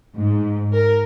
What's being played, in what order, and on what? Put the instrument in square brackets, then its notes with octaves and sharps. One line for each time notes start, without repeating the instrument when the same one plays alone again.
[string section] G#2
A#4